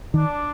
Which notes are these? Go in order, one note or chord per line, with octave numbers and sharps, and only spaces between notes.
D#3 D4